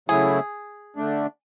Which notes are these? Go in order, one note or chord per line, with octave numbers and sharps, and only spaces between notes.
C#3 F#3 A3 E4 G#4
D3 A3 D4